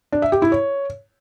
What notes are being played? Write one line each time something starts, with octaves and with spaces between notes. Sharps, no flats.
D4
E5
G4
E4
C#5